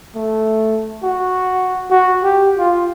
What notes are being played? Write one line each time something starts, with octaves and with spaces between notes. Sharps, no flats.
A3
F#4
F#4
G4
F4